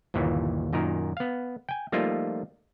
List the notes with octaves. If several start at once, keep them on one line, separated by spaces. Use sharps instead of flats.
G1 D#2 A#2 E3
F#2 A#2 D#3 A#4
B3 F5
G5 G#5
F3 G3 A3 A#3 D#4 F4